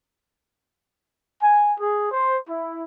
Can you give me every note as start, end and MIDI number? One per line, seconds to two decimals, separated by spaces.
1.42 1.74 80
1.79 2.08 68
2.12 2.36 72
2.49 2.83 64